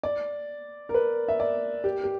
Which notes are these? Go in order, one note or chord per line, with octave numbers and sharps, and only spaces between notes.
D5
A#4
B4
E5
D5
G4
G4